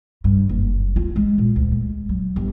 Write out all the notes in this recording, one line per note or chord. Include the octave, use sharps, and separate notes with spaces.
G2
F#1
F4
G#3
A#2
D2
G#3
F#3
G1